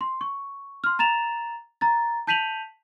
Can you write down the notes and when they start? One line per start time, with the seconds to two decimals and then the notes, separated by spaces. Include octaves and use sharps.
0.01 C6
0.21 C#6
0.84 C6 F6
0.99 A#5 A6 E7 F7
1.81 A#5 A6
2.27 A5 G6 B6 D#7 F7 F#7